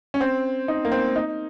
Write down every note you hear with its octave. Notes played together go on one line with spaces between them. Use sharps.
C#4
C4
D#4
A#3
C4
D#4